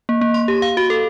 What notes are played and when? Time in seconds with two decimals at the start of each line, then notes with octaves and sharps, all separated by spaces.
0.09 A#3
0.21 A#3
0.34 C6
0.48 G4
0.62 F5
0.77 F#4
0.90 A4